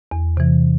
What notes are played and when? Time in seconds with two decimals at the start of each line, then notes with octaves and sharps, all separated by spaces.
0.11 E2
0.37 C3 E3